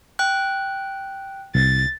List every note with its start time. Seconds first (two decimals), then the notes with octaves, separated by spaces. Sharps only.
0.19 G5 F#6
1.55 C2 A6